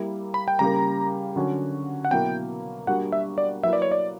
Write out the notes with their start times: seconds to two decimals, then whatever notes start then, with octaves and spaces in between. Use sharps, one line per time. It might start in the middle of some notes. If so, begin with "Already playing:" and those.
Already playing: G3 A#3 E4
0.34 B5
0.48 G5
0.59 C#3 G3 A#3 A#5
1.36 D3 F#3 C#4 F#4
2.05 F#5
2.11 B2 F#3 A#3 E4 G5
2.87 G3 A#3 D4 F#4 F#5
3.12 E5
3.38 D5
3.63 F#3 A#3 E4 B4 E5
3.73 D5
3.82 C#5
3.92 D5